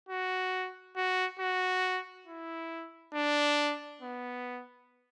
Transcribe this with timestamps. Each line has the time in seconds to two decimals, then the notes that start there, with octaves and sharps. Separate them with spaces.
0.09 F#4
0.96 F#4
1.39 F#4
2.27 E4
3.14 D4
4.02 B3